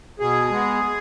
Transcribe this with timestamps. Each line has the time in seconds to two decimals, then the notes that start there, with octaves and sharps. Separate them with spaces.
0.20 B2 G#4
0.50 G#3 B3